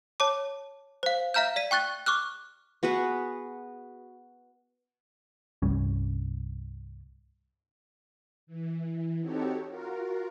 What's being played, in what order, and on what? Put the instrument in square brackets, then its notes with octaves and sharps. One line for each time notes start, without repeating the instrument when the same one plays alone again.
[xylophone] C#5 A5 D6
C5 F5
E5 F5 A#5 F6 G6
D5 B6 D#7
G5 C#6 F#6 A6 G7
C#6 D6 F6 F#6
[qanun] B3 F#4 G#4 B4
[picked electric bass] C2 G2 G3 C#4
[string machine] E3
C4 D#4 F#4 G4 A4 C#5
F4 F#4 A#4